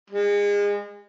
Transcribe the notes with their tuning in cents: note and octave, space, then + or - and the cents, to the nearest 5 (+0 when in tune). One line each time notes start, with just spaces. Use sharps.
G#3 -30